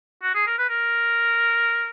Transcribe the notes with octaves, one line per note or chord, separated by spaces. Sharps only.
F#4
G#4
A#4
B4
A#4